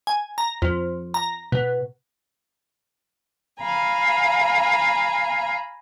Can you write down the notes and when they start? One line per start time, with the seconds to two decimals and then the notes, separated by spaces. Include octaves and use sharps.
0.07 G#5
0.38 A#5
0.62 F2
1.14 A#5
1.52 B2
3.59 F5 G#5 A#5 B5